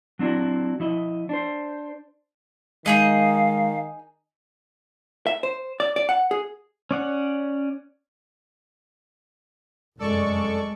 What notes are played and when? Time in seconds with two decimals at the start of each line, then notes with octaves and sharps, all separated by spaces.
0.19 F#3 C4 D4 E4 F#4
0.80 F3 E4 D#5
1.29 D4 C5
2.86 D#3 G#3 D#4 G#4 D#5 F5
5.27 E5
5.43 C5
5.80 D5
5.96 D5
6.09 F#5
6.31 G#4
6.91 C#4 D5 F#5
9.99 F1 F#2 G#3 A4 D5 C#6